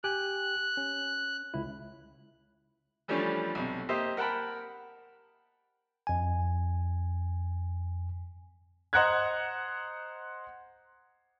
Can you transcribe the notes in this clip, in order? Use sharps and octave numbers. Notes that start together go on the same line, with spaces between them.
G4 G5 G#5 F#6
C#4
C#2 E4
E3 F3 G3 A3 C#4 D4
B1 C3
A#3 G4 C5 D#5 E5
A#4 F#5 G5 A5 B5
F2 G#5
C5 D#5 F#5 A#5 F#6 G#6